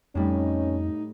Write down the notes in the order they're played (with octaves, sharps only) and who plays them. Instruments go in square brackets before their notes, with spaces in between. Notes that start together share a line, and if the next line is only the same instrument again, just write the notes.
[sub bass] F2 [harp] A2 G3 [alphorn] C#4 [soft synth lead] D#4